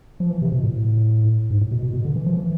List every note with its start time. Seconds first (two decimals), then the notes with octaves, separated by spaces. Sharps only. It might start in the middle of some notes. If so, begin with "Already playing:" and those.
0.20 F3
0.30 E3
0.42 C3
0.52 B2
0.63 A2
1.50 G#2
1.61 A2
1.71 B2
1.83 B2
1.93 B2
2.05 D3
2.16 E3
2.26 F3
2.37 E3